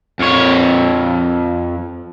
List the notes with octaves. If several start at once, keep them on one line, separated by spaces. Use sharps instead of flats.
F2 C#5